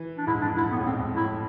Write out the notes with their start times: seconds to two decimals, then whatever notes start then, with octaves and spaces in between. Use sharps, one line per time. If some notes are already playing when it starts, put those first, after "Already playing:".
Already playing: E3
0.18 D4
0.27 G#2 E4
0.41 F2 D4
0.56 G#2 E4
0.71 A2 B3
0.80 G#2
0.86 C4
0.90 F2
0.99 G#2
1.16 A2 E4